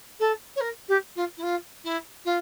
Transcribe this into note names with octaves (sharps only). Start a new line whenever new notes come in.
A4
C#5
A#4
G4
F4
E4
F4
E4
F4